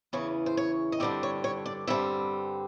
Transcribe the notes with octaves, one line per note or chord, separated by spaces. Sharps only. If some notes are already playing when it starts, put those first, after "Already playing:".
E2 C#3 E3 C#5
C5
C#5
D#5
G2 D3 G3 C4 D5
C#5
C#5
D5
G2 D3 G3 C4 E5